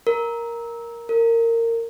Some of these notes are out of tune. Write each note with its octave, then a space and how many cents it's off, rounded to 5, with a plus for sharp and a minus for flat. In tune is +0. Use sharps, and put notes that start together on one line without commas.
A#4 +5
A#4 -20